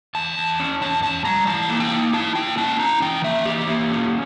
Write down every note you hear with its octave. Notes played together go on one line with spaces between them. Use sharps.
E2 A5
E2
C#4
E2 A5
E2 A5
G3 A#5
E3 A5
A#3
G5
A#3
E4 A5
A#3 G5
C#4 A5
E4 A#5
E3 G5
A#3 E5
E3 G4
A#3
C#4